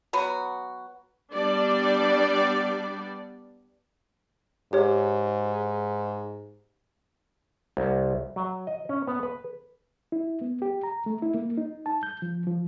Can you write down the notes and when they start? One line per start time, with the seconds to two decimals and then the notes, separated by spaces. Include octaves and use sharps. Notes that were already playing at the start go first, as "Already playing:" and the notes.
0.13 F#3 B3 F#4
1.34 G3 B3 D4 G4 D5
4.73 G#2 G4 C#5
7.77 C2
8.36 F#3
8.67 D#5
8.89 C#4
9.07 B3
9.23 B4
10.12 E4
10.41 B3
10.62 G4
10.83 A#5
11.06 A3
11.22 E4
11.34 A#3
11.58 D#4
11.86 A5
12.03 G6
12.22 F3
12.47 F3